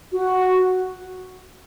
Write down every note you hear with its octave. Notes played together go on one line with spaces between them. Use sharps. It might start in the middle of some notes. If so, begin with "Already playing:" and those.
F#4